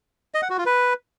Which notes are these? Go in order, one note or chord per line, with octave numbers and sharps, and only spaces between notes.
D#5
F#5
F#4
F4
B4